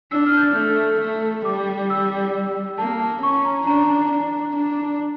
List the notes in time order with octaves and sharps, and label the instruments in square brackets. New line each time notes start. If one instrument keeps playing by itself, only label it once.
[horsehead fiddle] D4 [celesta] E6
[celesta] F6
G6
A6
[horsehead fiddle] A3
A3
[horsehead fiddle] G3 [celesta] D6
[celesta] E6
[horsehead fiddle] A#3 [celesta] A5
[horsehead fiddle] C#4 [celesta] C#6
[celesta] A#5
[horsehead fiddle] D4 [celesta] A#5
[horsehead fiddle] D4
D4